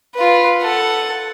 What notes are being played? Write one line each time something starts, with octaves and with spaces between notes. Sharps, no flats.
F4 B4
A4 F#5